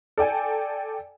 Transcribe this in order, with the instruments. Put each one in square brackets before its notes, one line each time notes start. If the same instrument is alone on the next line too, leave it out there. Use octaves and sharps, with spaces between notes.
[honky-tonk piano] A4 D5 G5 G#5